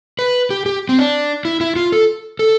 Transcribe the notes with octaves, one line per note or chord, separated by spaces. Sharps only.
B4
G4
G4
C4
D4
E4
E4
F4
A4
A4